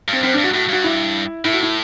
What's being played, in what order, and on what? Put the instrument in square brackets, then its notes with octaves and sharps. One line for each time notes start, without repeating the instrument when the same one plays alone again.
[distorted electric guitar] G2 [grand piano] C4
[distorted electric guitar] F#2 [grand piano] C4
[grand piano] D4
[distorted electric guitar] G2
[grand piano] F#4
[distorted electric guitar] A2 [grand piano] F#4
[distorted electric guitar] G2 [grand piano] F#4
[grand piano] E4
[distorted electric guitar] A2 [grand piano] E4
[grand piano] F#4
E4